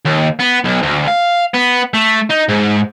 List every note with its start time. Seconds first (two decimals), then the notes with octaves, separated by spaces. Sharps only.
0.05 D#2
0.39 B3
0.64 B1
0.83 D2
1.08 F5
1.54 B3
1.94 A3
2.30 D#4
2.49 G#2